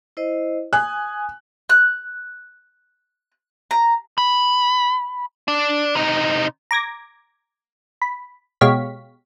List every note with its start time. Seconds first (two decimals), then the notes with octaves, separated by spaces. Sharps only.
0.17 E4 C5 D#5
0.73 G#5 D#6 F#6
1.70 F#6
3.71 A#5
4.18 B5
5.48 D4
5.95 C3 D#4
6.71 A#5 D6 G#6 A#6
8.02 B5
8.61 B2 G#3 G4 C#5 F5 B6